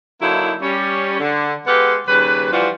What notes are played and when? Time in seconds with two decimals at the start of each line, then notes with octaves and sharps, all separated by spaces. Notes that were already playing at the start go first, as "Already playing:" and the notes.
0.22 D3 F#3 A#3 D#4 E4
0.62 G3 C#4
1.19 D3
1.67 G#3 B3 G4 A4 F5 F#5
2.08 D#2 C#3 G3 B4
2.52 E3 F3 G3 D4 F4 F#4